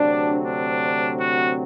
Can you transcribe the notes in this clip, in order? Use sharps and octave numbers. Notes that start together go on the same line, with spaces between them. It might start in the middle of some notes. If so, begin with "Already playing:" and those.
Already playing: D2 C3 F#3 C4 D4
D4
F#4